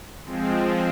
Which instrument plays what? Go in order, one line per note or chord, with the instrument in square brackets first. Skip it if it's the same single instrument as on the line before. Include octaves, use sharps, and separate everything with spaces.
[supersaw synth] F3 G#3 C4